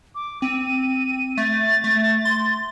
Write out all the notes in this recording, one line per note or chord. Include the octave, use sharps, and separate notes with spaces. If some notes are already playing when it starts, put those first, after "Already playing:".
D6
C4 D#7
A3 A6
A3
C6